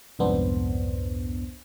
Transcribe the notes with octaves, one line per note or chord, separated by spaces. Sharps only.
C2 F2 G#2 B3 D4 C5